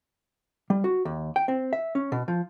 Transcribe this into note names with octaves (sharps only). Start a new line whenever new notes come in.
G3
F#4
D#2
G5
C4
E5
C#4
B2
F3